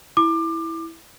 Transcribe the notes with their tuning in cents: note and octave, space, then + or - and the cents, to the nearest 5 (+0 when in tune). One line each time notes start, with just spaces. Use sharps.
E4 -5 D6 +25